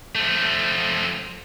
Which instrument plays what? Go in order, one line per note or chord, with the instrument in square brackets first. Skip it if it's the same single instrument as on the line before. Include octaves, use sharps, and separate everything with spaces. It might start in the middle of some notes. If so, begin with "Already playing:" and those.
[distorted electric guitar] F3 A3